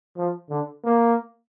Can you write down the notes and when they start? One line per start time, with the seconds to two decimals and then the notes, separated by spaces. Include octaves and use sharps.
0.17 F3
0.50 D3
0.84 A#3